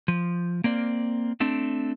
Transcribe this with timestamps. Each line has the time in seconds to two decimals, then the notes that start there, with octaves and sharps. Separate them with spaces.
0.08 F3
0.64 A#3 C4 D5
1.40 A3 C4 D4